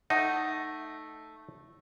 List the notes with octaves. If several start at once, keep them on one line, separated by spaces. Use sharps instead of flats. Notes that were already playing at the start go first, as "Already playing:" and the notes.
A3 D#4 A4 F#5